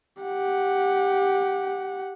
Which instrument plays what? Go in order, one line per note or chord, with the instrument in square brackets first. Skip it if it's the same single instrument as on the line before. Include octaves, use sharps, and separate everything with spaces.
[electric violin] G4 F#5